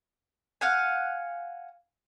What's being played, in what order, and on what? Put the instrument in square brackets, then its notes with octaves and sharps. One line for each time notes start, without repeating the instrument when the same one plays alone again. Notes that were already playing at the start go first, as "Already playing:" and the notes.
[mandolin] F5 F#5 G#5